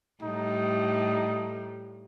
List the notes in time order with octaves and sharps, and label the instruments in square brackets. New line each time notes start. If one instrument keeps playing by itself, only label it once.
[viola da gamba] A2 G3 [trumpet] D#4